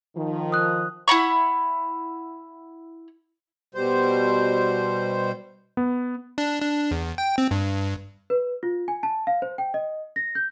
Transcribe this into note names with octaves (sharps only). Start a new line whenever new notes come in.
D#3 F3
D#6 F#6
E4 F#5 B5 C#6
B2 G3 C5
B3
D4
D4
E2
G5
C4
G2
B4
F4
G#5
A5
F5
C5
G5
D#5
A#6
G6